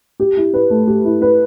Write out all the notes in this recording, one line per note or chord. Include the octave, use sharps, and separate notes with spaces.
G4
E4
B4
A3
G4
E4
B4